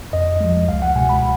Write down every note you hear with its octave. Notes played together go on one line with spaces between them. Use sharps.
F2 D#5
F3 G#3
C#2 F5
F#5
B2 G#3 G#5
B5